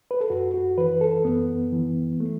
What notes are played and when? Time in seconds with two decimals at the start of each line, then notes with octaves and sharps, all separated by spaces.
0.11 B4
0.21 A4
0.30 F#2 F#4
0.54 F#4
0.78 E3 B4
1.01 A4
1.25 F#2 B3
1.72 E3
2.20 A3